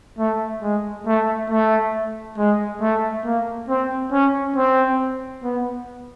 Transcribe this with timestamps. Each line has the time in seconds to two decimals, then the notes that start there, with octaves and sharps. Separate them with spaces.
0.18 A3
0.62 G#3
1.07 A3
1.50 A3
2.38 G#3
2.81 A3
3.25 A#3
3.69 C4
4.12 C#4
4.56 C4
5.43 B3